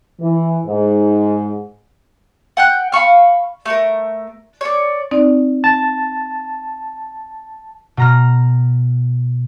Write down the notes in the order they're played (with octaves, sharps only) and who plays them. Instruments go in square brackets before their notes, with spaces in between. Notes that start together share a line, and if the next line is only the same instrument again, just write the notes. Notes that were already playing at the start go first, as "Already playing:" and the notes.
[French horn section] E3
G#2
[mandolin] F#5 G5 F#6
F5 B5 C#6 F6
A3 A#4
C#5 D5
[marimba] C4 D#4 D5
[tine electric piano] A5
[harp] B2 A#5 F6